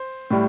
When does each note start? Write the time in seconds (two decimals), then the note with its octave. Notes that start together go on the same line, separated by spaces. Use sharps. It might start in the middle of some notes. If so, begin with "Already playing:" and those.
Already playing: C5
0.31 A2 G3